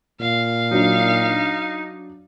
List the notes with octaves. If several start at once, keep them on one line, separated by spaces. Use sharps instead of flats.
A#2 F5
F#3 D4 D#4